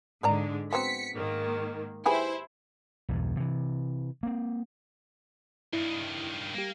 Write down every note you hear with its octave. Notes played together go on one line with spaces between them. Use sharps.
G#2 D3 G#3 A#4 D5 A#5
F#3 B3 C4 B6 C#7
G#2 D#3 A#3
E4 G4 G#4 B4 C5
B1 E2 G2
C3 E3
A#3 C4
G2 D#3 E4
G3 A#3 G4